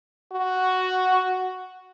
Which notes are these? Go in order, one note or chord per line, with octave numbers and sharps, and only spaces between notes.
F#4